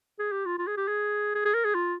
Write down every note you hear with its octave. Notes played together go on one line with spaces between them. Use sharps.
G#4
G4
F4
F4
G#4
G4
G#4
G#4
G#4
A#4
G#4
F4